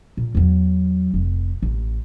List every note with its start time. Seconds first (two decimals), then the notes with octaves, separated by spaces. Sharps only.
0.17 A#2
0.35 E2 F#3
1.14 F1
1.62 A1